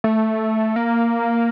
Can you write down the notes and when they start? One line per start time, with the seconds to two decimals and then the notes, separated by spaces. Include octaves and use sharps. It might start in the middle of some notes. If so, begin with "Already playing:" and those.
0.04 A3
0.76 A#3